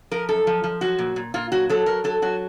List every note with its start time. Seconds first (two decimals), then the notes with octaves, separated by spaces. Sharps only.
0.11 F3 A#4
0.29 F#2 A4
0.47 F3
0.64 F3
0.81 F#3 F#4
0.99 A#2
1.16 A#2
1.34 A#2 F4
1.52 F#3 F#4
1.69 F#3 A4
1.86 F#3 A#4
2.04 F#3 A4
2.22 F#3 F#4